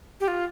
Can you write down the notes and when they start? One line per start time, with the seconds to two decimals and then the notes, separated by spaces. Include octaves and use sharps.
0.20 G4
0.28 F4